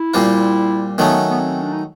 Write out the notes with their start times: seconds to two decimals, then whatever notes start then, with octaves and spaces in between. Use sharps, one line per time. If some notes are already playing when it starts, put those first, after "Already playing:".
Already playing: E4
0.14 A#2 G3 C4 F4
0.98 D#3 F#3 A3 B3 C#4
1.30 B3
1.40 C4
1.62 D4
1.73 D#4